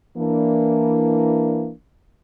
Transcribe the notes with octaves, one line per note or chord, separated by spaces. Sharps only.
E3 A#3 D4